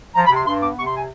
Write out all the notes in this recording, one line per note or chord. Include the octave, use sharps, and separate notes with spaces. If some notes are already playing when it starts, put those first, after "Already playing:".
F3 A#5
B5
C3 C6
G2 C6
B3 D6
C3 C#6
C6
G#5